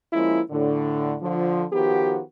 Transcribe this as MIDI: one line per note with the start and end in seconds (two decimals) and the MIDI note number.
0.13 0.40 53
0.13 0.40 56
0.13 0.40 58
0.13 0.40 61
0.13 0.40 64
0.50 1.15 45
0.50 1.15 50
1.22 1.64 50
1.22 1.64 53
1.72 2.21 51
1.72 2.21 53
1.72 2.21 59
1.72 2.21 66
1.72 2.21 67